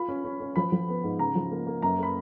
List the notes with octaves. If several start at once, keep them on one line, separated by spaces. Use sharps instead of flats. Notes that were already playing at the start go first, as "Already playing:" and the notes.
Already playing: F4 B5
C#4
C#4
C#4
F3 B5
F3
B3
G#2
C#3 A#5
F3
A#3
A#3
F#2 A#5
A#3 B5